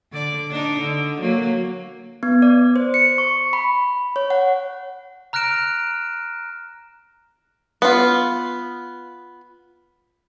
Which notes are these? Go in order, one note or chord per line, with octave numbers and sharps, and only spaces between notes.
D3 D5
D4 D#4
D3
F#3 A#3
B3
D5
C5
C#7
C#6
B5
C#5
F#5
A#5 F6 F#6 A#6 D7 E7
B3 F4